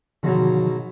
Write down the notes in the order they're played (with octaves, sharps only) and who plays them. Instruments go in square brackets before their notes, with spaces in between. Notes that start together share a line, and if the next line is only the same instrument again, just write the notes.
[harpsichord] G#2 B2 F#3 [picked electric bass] D3 D#3 F3